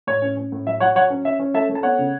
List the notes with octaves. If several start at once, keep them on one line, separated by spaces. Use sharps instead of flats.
A2 C#5
C#4
C#4
A2
F#3 E5
F#3 C#5 F#5
F#3 C#5 F#5
C#4
C#4 E5
C#4
A3 E5 A5
A3
A5
B3 C#5 F#5
C#3